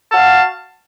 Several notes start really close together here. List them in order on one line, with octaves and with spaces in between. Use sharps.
A5 F#4 F5